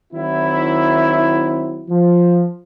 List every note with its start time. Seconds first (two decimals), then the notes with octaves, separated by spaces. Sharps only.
0.13 D#3 F#3 C4 E4
1.89 F3